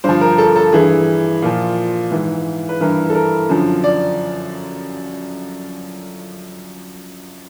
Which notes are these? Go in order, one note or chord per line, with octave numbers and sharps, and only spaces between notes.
G2 D3 F3 C5
A#4
A4
A4
G2 E3 G#4
A#2 F3
G#2 E3
B4
G2 E3 A#4
A4
A#4
F#2 D3 F3
D5